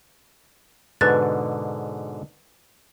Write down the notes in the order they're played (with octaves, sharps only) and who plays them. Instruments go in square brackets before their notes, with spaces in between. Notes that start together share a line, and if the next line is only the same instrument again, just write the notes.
[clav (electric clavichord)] G#2 B2 D3 [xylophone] B4 F#6 A6